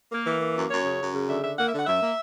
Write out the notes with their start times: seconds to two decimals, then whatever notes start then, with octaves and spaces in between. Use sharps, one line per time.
0.12 A#3
0.26 E3
0.40 A#3
0.55 F#2
0.70 F#2 C#5
0.84 C#3
0.99 F#2
1.13 C#3
1.28 D3 E5
1.43 D3 E5
1.58 A#3 F#5
1.67 E5
1.72 D3
1.78 F#5
1.87 F#2 E5
2.02 A#3